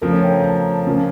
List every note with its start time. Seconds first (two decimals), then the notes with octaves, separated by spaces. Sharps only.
0.02 C#3 F3 A3 A#4
0.13 C#5
0.23 G5
0.34 A#5
0.44 A5
0.87 C#3 F3 A#3